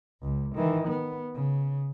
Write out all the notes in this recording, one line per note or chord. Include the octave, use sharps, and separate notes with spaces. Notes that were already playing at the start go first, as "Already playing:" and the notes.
C#2
D#3 E3
B3
C#3